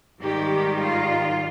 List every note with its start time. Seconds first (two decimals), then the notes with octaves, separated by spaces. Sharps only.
0.20 G#2 D#3 G3 G4
0.80 F4